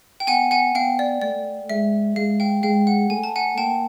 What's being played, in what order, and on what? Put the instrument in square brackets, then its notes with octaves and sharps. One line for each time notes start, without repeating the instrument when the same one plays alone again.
[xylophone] G5
[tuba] B3 [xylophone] F#5 G#5
[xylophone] F#5 G#5
[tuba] B3 [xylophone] F5 G5
[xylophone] D5
[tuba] A3 [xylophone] D5
[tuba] G#3 [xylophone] E5
[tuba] G#3 [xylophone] F5
[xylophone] F5 G5
[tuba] G#3 [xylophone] F5 G5
[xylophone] F#5
[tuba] A3 [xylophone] G#5
[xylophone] A5
F#5 G#5
[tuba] A#3 [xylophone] G5 A5